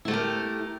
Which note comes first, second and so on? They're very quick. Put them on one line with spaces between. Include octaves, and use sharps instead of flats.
E4 A3 G4 A#4